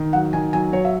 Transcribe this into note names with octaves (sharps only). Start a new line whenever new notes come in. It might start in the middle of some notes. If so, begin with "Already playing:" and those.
Already playing: D#3
F#3 F#5
D#3 G#5
F#3 G#5
F#3 C#5
E5